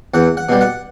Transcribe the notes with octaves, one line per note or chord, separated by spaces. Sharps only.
E2 F#5
F#5
B2 G3
F#5